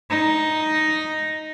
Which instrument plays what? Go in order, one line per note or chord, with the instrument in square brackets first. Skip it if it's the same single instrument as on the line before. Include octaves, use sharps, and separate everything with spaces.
[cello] D#4